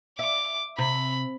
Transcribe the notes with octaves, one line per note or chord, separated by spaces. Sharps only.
E5 D6
C3 B5